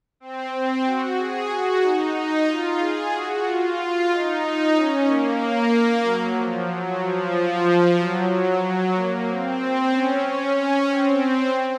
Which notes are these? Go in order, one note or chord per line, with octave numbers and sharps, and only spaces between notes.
C4
C4
F#4
G#4
F#4
D#4
D#4
F4
G#4
F#4
F4
D#4
C#4
A#3
F#3
F3
F#3
F3
F#3
F#3
F#3
A#3
C4
C#4
C#4
C#4
C4